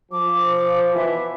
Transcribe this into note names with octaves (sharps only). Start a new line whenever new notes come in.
F3 D6
B2 E3 E5